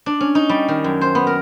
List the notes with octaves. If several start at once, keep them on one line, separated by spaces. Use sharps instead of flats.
D4
C#4
D#4
G3
D#3
F#2
C5
B3
A#4